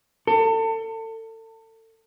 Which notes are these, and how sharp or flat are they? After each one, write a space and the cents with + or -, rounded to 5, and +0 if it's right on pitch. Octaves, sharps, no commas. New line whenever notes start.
A4 +30